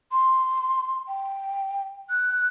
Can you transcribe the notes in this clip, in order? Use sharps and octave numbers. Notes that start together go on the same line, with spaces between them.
C6
G5
F#6